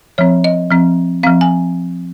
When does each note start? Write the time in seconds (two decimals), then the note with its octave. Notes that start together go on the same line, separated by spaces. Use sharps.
0.18 F3 C4 C#5
0.44 D#5
0.71 F3 C4
1.23 F3 C4 F5
1.41 G#5